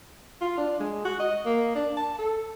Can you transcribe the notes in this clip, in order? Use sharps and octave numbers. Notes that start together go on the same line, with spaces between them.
F4
D4
G#3
F#4
D#5
A#3
D4
A5
A4